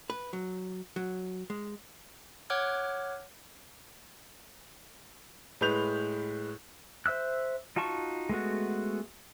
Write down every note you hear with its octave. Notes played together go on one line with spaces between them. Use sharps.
B4
F#3
F#3
G#3
C#5 F#5 D6 F6 F#6 G#6
A2 G#3 B4 G6 F7
C5 E5 E6 F#6
D#4 F4 F#4 A5 C#6
G#3 A3 B3 F#4